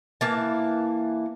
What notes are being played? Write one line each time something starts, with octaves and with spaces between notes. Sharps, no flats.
E3 A#3 A5